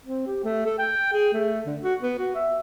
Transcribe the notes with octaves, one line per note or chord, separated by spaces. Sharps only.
C4
G4
A3
A4
G5
G#4
A3
D3
F#4
B3
F#4
E5